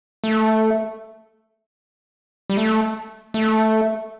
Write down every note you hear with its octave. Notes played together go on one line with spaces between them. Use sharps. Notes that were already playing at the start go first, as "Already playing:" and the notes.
A3
G3
A3
A3